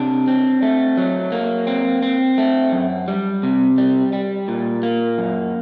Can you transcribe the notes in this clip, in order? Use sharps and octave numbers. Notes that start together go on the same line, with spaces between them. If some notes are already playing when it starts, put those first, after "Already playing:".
Already playing: C3 D4
C4
A3
F#3
A#3
C4
C4
A3
F#2
G3
C3
G3
G3
A#2
A#3
F#2